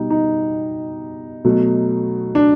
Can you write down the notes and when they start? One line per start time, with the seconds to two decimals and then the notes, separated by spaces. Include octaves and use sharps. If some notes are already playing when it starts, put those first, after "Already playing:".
Already playing: B2 G3 D#4
0.10 D#4
1.45 B2 F#3 A3
2.35 D4